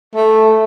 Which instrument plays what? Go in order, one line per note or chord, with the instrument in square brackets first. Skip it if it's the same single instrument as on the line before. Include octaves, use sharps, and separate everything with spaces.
[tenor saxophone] A3